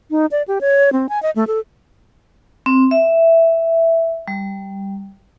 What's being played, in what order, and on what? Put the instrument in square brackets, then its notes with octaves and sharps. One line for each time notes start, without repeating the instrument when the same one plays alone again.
[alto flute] D#4
D5
G4
C#5
C4
G#5
D#5
A3
A4
[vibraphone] C4
E5
G3